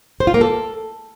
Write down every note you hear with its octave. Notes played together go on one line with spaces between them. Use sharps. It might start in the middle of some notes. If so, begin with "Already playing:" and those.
C5
F4
A#3
A4